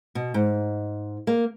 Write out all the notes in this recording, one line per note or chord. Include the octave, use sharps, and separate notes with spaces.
B2
G#2
A#3